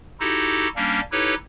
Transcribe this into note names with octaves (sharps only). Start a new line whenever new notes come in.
D#4 E4 F#4 G4 A4
G3 A#3 C#4 D4
D#4 E4 G4 A4 B4 C#5